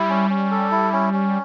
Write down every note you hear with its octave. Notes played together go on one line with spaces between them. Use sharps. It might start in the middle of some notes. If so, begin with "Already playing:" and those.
Already playing: G3 E4
C#4
C#4
A4
E4
C#4
C#4